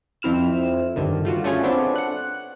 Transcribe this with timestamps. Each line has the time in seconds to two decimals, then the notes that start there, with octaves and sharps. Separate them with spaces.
0.22 F2 C4 E4 F6 E7
0.96 G2 D3 D#3
1.25 G3 F4 F#4
1.44 A3 C#4 F4 G#4 C#5
1.63 B3 C4 D4 A4
1.96 F#5 F#6